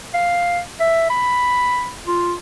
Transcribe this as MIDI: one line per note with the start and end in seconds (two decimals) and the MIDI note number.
0.14 0.60 77
0.80 1.06 76
1.10 1.92 83
2.07 2.34 65